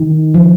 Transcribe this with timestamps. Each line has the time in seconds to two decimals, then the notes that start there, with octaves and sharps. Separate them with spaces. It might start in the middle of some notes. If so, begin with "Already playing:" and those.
Already playing: D#3
0.34 F3